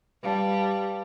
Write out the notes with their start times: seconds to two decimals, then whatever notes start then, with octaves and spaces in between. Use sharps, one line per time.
0.23 G3 B4 F5 A5